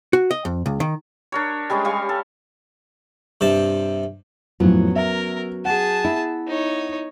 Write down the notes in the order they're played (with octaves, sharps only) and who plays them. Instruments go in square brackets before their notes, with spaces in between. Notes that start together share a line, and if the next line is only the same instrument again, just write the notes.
[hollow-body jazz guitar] F#4
D#5
F2
C#2
D#3
[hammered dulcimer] D4 A#4 C#5
G3 G#3 C#4 G#4
G3 F5 C#6
A4
[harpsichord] G2 C3 A5
[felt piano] F2 A2 [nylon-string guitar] F#3 B3 C#4
[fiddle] A#4 [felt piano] E5
[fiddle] G#4 A5 [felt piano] F#5
[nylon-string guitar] E4
[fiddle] D#4 C#5